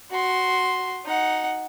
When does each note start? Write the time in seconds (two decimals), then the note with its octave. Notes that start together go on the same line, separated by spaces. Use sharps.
0.11 F#4 C6
1.06 D#4 F#5